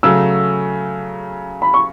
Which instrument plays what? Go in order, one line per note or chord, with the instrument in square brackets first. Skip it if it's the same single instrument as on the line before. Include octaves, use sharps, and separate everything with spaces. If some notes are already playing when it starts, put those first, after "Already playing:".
[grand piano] C#3 F#3 A3 [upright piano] E6
[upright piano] B5
C#6